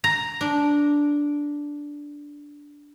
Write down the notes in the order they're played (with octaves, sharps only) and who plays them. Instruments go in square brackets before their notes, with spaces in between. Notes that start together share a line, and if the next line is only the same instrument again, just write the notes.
[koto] A#5
[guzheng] D4